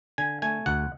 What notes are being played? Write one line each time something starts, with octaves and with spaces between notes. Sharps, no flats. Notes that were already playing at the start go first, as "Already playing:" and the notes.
D3 G#5
A3 G#5
D2 F#5